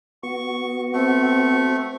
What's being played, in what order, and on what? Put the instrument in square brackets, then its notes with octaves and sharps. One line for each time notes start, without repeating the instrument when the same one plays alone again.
[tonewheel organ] B3 F#4 [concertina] C#6
[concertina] A3 C#6 [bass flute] C4